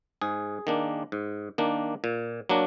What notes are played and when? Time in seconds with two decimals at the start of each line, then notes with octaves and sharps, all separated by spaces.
0.22 G#2 G#4
0.67 D#3 A#3 D4
1.12 G#2
1.58 D#3 A#3 D4
2.04 A#2
2.49 F#3 A#3 D4